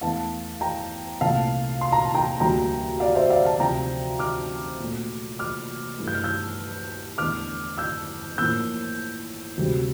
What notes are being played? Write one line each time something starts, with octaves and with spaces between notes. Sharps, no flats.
E2 E3 A3 F5 A5
G5 A#5
C2 A#2 A3 F5 A5
C6
A#5
A5
G5 A#5
D2 D3 G3 A#3 G5 A#5
D5 F5
C5 E5
D5 F5
F5 A5
D2 C3 F3 G5 A#5
D6 F6
A#2 A3
D6 F6
G2 E3 A3
G6
F6
E6 G6
E2 D3 A3 D6 F6
E6 G6
A2 F3 A#3 E6 G6
D2 C3 G3